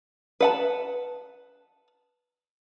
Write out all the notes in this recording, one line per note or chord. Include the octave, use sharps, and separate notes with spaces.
B4 F#5 A5